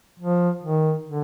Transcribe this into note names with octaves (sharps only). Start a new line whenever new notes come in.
F3
D#3
D3